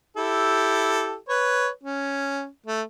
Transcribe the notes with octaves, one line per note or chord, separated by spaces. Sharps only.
E4 G4 A4
B4 C#5
C#4
A3